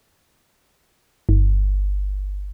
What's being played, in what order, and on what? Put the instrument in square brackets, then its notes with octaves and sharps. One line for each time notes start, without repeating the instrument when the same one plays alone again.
[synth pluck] G1